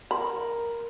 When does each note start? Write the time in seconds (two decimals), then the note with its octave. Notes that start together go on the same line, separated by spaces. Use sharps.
0.11 A#4 B5